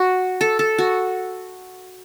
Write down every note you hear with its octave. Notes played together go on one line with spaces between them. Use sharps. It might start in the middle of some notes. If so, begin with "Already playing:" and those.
Already playing: F#4
A4
A4
F#4